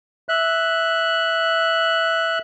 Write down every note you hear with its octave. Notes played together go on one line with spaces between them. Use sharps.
E5 F#6